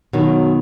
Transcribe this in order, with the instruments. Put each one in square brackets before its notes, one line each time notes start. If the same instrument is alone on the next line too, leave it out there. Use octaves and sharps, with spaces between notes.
[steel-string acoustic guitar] B2 D#3 [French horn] F#3